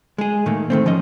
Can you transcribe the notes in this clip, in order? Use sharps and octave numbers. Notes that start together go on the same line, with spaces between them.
G#3 G#4
A2 D#3 A3 A#3
D#3 A3 C4
F3 C#4 D#5